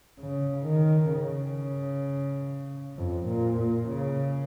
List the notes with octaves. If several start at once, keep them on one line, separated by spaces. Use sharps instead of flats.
C#3
D#3
C#3
F2
A#2
A#2
C#3